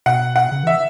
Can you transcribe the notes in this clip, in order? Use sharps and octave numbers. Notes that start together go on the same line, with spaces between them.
B2 F#5
F#5
C#3
E3 E5